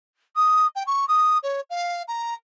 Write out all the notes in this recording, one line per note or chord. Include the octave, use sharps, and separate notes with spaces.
D#6
G5
C#6
D#6
C#5
F5
A#5